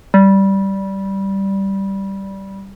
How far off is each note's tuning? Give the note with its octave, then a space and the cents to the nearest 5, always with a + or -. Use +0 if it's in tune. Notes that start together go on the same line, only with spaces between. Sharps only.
G3 -10